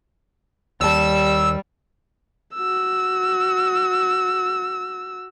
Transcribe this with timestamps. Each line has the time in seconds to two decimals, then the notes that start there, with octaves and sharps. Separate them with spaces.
0.81 D#2 G3 A5 E6
2.55 F#4 E6